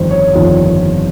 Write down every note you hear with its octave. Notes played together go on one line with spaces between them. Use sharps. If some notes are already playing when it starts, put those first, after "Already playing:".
Already playing: G1 F2 D#3 G3 C5
C#5
G1 F2 D#3 G3